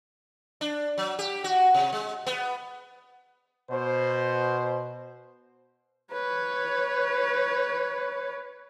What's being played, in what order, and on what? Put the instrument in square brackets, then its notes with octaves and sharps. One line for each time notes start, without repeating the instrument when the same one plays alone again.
[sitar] D4
F#3
G4
F#4
C3
G#3
B3
[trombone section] B2 C5
[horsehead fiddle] B4 C#5